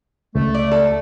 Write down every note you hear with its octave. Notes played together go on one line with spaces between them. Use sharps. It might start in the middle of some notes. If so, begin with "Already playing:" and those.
C#2 A3
D5
A4